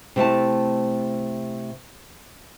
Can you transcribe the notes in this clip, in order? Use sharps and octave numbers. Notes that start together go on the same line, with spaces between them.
C3 A3 E4 A5